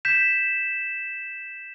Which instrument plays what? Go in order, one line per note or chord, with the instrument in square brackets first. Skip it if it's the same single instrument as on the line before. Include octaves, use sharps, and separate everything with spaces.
[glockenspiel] G6 B6 E7